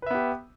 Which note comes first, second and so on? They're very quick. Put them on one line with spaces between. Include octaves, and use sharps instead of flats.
B4 E5 B3 G4